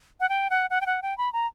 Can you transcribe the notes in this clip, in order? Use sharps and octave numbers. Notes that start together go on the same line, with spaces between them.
F#5
G5
F#5
F#5
G5
F#5
G5
B5
A#5